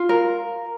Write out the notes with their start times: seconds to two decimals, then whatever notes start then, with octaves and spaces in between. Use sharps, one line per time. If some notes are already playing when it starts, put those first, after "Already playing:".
Already playing: F4 F5
0.09 A#4